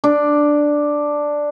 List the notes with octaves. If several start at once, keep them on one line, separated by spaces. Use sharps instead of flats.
D4